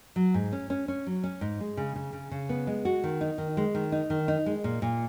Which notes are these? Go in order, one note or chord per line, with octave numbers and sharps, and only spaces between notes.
F#3
G#2
C#4
C#4
C#4
F#3
C#4
G#2
G#3
C#3
C#3
C#3
C#3
B3
G#3
F#4
D#3
D#4
D#3
G#3
D#3
D#4
D#3
D#4
G#3
A#2
A#2